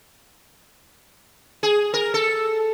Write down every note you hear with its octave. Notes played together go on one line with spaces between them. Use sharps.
G#4
A#4
A4